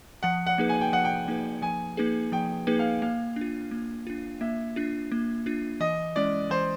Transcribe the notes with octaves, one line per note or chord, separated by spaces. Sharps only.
F3 F#5
F#5
A#3 D#4 G#4 B4
G#5
G5
F3 F#5
G5
A#3 D#4 G#4 B4
F3 G#5
A#3 D#4 G#4 B4
F3 G5
A#3 D#4 G#4 B4
F5
A#3 F5
D4 F4
A#3
D4 F4
A#3 E5
D4 F4
A#3
D4 F4
E3 D#5
G#3 C#4 E4 D5
E3 C5